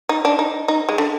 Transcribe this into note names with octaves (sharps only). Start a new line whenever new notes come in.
D#4
D4
D#4
D#4
G#3
D3